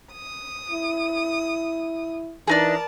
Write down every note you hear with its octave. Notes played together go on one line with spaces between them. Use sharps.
D#6
E4
E3 D4 D#4 G#4 A#4 D5 A5